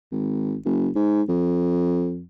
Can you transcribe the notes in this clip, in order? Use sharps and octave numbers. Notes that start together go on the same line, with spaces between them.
G#1
F#1
G#2
F2